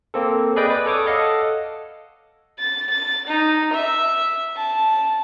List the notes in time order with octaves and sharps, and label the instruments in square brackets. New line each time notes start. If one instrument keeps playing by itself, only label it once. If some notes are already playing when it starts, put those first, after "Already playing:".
[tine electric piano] A#3 C4 A4
G#4 B4 D5 D#5 G5
B4 D5
A4 C#5 D6 D#6
A4 D#5 F5 F#5
[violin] A6
A6
D#4
E5
A5